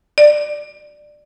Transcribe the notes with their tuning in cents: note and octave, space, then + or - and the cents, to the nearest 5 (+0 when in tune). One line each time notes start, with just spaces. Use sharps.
D5 +15